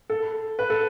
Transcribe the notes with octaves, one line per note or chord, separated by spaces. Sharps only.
A4
B4
A4